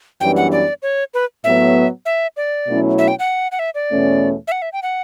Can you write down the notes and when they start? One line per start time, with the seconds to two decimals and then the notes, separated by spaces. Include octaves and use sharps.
0.20 F#2 E3 G3 B3 D4 G5
0.37 F#5
0.52 D5
0.82 C#5
1.14 B4
1.44 A2 F#3 B3 E5
2.06 E5
2.37 D5
2.67 B2 F#3 A3 C#4 E4
2.98 E5
3.08 G5
3.19 F#5
3.52 F#5
3.59 E5
3.75 D5
3.90 E2 B2 A3 C#4
4.48 E5
4.52 F#5
4.62 E5
4.73 G5
4.83 F#5